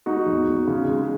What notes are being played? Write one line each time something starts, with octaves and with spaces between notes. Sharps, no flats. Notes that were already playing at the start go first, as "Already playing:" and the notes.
G#3 D#4 F#4
E2
E2
C#3
G#3